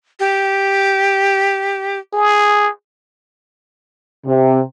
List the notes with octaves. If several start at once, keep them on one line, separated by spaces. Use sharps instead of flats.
G4
G#4
C3